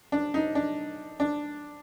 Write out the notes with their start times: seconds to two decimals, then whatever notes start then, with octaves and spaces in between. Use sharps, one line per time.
0.12 D4
0.34 D#4
0.55 D4
1.20 D4